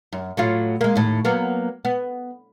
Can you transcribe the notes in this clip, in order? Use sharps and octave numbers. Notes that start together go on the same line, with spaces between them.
F#2
A2 F#3 F4
G#3 A#3
D#2 A2
F#3 A#3 B3
B3